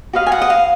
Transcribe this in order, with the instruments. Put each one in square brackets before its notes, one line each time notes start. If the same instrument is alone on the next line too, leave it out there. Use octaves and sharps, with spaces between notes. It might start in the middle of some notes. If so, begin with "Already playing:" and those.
[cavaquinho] F#4 B4 D#5 F5
G#5
F#5
D#5
F5